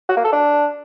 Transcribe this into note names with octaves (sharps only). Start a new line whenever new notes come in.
F#4
A#3
A4
D4